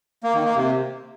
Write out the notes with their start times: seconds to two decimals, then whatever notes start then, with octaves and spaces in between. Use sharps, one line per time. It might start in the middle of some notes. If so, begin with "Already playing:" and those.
0.23 A#3
0.34 D#3
0.45 A#3
0.55 C3